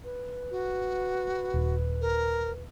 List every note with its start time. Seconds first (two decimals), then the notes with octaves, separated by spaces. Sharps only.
0.04 B4
0.51 F#4
1.54 D#1
2.01 A#4